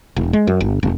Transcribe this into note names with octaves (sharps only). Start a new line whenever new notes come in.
E1
G#3
F#2
G1
F1